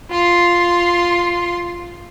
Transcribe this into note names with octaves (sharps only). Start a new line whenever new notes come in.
F4 C6